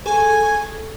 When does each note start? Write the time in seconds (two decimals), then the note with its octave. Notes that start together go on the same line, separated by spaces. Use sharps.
0.06 G#4 A4 G#5 C#6